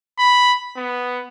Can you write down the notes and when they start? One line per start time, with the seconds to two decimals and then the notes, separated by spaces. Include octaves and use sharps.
0.19 B5
0.76 B3